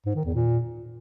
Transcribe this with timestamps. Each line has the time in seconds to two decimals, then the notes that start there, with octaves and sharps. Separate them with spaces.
0.06 G#2
0.15 D#3
0.25 E2
0.35 A#2